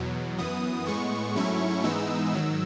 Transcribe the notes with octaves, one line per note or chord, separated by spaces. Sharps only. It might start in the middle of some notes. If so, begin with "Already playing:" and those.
Already playing: E2 B2 F#3
F#2 E3 B3 D#6
A2 G#3 B3 C#6
G#2 F#3 A3 C#4 E4
G#2 E3 G#3 B3 D#4 E6
G#2 D#3 F#3 E6